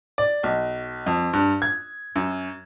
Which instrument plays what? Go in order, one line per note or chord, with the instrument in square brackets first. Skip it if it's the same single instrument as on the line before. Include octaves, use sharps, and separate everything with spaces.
[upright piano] D5
B1
F2
G2
G#6
F#2